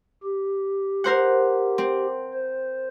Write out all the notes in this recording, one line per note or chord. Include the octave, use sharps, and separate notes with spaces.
G4
A#4 C5 F#5
C4
C5